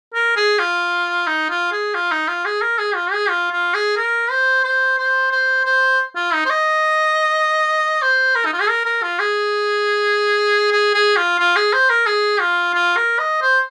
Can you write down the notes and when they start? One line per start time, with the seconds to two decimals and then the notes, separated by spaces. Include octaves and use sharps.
0.14 A#4
0.36 G#4
0.59 F4
1.27 D#4
1.50 F4
1.72 G#4
1.94 F4
2.11 D#4
2.28 F4
2.45 G#4
2.61 A#4
2.78 G#4
2.95 F4
3.12 G#4
3.29 F4
3.51 F4
3.74 G#4
3.97 A#4
4.31 C5
4.64 C5
4.98 C5
5.32 C5
5.65 C5
6.16 F4
6.33 D#4
6.45 C5
6.50 D#5
8.02 C5
8.35 A#4
8.45 D#4
8.53 F4
8.61 G#4
8.69 A#4
8.85 A#4
9.03 F4
9.19 G#4
10.72 G#4
10.94 G#4
11.16 F4
11.39 F4
11.56 G#4
11.73 C5
11.90 A#4
12.06 G#4
12.40 F4
12.74 F4
12.96 A#4
13.19 D#5
13.42 C5